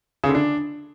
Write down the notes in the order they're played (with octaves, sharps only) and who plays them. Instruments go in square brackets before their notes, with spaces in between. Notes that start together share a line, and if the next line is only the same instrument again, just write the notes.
[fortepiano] C#3
D3
D4